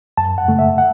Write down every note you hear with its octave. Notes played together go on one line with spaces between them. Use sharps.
F#2 A5
F#5
C#3 A3
E5
F#5